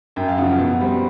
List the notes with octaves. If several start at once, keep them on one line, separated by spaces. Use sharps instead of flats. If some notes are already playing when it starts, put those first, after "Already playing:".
F#2 G5
F5
C#3 F3 F#5
B2 F#5
G3 C4